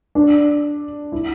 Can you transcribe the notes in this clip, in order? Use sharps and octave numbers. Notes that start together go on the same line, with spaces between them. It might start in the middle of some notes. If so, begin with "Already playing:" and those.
D4
E4